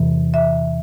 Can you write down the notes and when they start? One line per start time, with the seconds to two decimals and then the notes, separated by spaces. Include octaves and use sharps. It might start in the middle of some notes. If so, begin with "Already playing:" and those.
Already playing: E2 C3 E3
0.34 E5